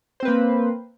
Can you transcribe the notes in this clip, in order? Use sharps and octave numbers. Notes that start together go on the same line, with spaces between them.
A#3 C4 B4 C5